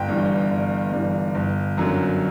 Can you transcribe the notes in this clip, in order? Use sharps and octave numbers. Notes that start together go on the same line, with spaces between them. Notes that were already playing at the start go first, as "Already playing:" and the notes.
Already playing: G1 G5
G2 E3
G1
G2 E3
G1
F#2 D3 F#3